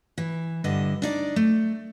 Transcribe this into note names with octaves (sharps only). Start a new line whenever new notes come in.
E3
G2 D3 E4 D#5
D4 D#4 D5
A3